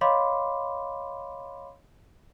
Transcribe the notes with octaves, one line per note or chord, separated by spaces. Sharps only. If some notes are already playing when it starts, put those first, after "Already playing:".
C#5 D#5 F5 B5 C6 D6